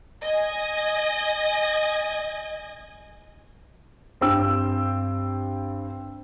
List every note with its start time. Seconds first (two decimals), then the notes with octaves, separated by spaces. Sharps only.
0.21 D#5 G#5
4.21 G2 C4 G5 E6